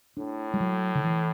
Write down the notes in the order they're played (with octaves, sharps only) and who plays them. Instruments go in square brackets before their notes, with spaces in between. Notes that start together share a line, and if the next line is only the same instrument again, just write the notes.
[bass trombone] A2 [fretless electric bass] D4
[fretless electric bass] G3
F#3
D3
E3